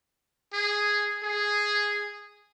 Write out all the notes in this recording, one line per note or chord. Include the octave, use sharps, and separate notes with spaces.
G#4
G#4